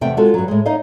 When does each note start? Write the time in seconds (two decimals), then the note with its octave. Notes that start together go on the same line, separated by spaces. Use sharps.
0.01 E2 C3 A3 E5 F#5 G5
0.17 G#3 C#4 F4 F#4 A4
0.34 G2 F#3
0.48 A2 G#3
0.66 D#4 C#5 D#5 F5